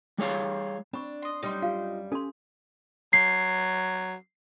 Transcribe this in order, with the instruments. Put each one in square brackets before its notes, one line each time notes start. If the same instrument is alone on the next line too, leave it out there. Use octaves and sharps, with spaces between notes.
[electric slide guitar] G3 G#4 C#5 F5
[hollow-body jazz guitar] C4 [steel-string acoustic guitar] D4 [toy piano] B5 C#6
[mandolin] D#5 C6
[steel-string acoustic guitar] F#2 G3 [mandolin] D#4 C6
[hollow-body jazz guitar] F4 G4 [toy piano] F5
[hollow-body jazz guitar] C#4 G4 G#5 [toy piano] A4 C6
[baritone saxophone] F#3 [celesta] C7